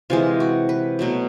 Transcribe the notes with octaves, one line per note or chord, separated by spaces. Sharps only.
C3 E3 G#3 F4
F#4
B4
B2 F#3 A3